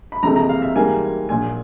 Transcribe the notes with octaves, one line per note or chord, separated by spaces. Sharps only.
B5
F#1 F2 C3 E3 G#3 A#5
A#5
F5
E5
G#2 E3 G3 A#3 G#5
A#1 A#2 F#3 G#5